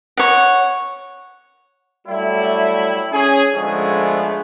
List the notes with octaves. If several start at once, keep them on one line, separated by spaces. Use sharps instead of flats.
C#5 F#5
F#3 G3 A3 E4
C#4 G#4
D3 F3 G#3 A3 B3